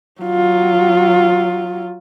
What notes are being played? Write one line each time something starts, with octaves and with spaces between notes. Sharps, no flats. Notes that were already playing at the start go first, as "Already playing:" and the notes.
F#3 F4